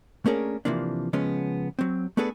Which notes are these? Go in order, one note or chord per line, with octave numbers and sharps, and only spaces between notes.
A3 A#3 C#4 D4 G#4 A#4
C3 E3 F3 A#3 D4
C#3 F3 G#3 B3 C#4
F#3 C4
A3 B3 D4 G#4 A4 B4